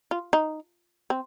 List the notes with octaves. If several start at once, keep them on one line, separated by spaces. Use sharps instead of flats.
F4
D#4
C4